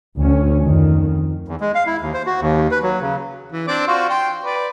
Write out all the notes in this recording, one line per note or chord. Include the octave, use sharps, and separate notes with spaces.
D2 D3 C#4
F2 D#3
E2
G#3
F5
E4
D#2
C5
F#4
D#2
B4
F#3
C#3
E3
C4 D4 D5
F4 F#4 C5
G5 C6
B4 D5